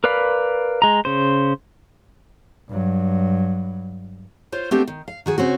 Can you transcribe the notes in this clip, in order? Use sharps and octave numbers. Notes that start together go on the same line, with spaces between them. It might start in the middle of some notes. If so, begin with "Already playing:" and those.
A#4 B4 D5 F5 B5
G#3 A#5
C#3 C5
G2 F#3
F4 C5 C#5
A3 B3 C4 D4 G4
D#3
F5
D#3 F#4 G#4
C#3 C4 C#4 F#4